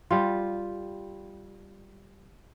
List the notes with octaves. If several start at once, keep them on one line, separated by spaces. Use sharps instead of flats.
G3 F4